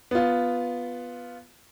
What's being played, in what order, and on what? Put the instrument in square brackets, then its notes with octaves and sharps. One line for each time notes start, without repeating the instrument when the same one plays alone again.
[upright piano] B3 F4